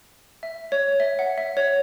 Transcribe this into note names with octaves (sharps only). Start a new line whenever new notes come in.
E5
C#5
E5
F#5
E5
C#5